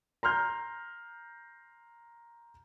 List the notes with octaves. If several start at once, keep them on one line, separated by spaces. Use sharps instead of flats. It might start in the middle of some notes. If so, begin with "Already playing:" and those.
A#5 C6 F6 G6